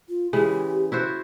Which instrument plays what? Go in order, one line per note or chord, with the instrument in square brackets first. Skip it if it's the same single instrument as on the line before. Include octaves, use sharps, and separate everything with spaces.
[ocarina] F4
[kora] C#3 E3 G#3 [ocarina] G4
[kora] E4 F#4 C5